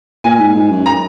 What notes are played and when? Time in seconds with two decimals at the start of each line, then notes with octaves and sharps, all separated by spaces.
0.24 A#2 G#5
0.39 G#2
0.55 G#2
0.70 F#2
0.86 A#5